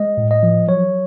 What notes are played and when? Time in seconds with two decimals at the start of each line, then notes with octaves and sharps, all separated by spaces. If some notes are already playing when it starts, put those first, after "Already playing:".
Already playing: G#3 D#5
0.17 A2
0.31 D#5
0.43 F3
0.68 F#3 C#5